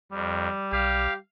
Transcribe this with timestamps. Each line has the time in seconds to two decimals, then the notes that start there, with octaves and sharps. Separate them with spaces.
0.12 F2 G3
0.72 B1 G4 F5